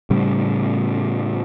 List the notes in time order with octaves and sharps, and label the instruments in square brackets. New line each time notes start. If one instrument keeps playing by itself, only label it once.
[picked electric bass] A2 C#3 G3